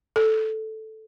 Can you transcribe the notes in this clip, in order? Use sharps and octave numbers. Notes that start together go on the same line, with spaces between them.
A4